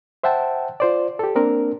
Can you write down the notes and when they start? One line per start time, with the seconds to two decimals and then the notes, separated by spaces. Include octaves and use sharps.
0.24 C5 E5 F#5 G5 A5
0.80 F4 C5 D5
1.19 G4 A4
1.35 A#3 C4 D4 A#4